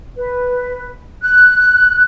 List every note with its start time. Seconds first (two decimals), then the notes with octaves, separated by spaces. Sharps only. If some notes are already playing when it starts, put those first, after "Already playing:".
0.17 B4
1.22 F#6